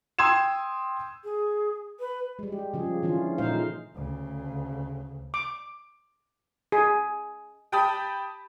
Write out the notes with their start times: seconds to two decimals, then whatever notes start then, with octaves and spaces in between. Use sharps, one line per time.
0.19 G5 C6 D#6 E6 G#6 E7
1.24 G#4
2.00 B4
2.39 G3 G#3
2.52 G4
2.73 C#3 F3 G#4
3.03 D3 E3 C#4 F4
3.38 A#2 G#3 D#4 C5 F5
3.95 D2 C#3
5.34 D6
6.72 G#4
7.72 G4 G5 A5 B5 D#6